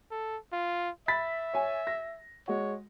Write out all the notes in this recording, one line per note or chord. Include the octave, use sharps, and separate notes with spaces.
A4
F4
E5 B5 A6 B6
C#5 G#5
A#6
G#3 F#4 C#5